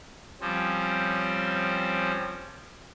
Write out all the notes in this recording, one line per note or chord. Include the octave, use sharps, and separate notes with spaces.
F3 G3 C4 C#4